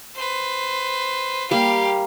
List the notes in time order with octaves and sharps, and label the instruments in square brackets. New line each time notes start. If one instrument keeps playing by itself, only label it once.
[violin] B4 C5
[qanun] G3 A#3 [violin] G4 F5